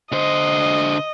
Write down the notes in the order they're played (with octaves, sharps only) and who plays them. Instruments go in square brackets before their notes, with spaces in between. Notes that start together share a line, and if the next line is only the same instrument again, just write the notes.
[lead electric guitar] D3 C5 [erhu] D#5